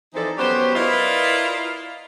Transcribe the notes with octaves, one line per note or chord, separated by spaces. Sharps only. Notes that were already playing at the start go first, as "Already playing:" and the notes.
E3 F3 C4 D#4 A4 D5
F#3 B3 C#4 G4 C5
E4 F4 A#4 B4 D5 D#5